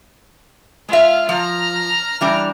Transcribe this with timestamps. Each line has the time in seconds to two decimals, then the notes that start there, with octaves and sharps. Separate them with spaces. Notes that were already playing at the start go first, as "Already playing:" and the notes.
0.89 G#3 F4 E5 F5
1.29 F3 A#5 F6
2.21 E3 G3 D4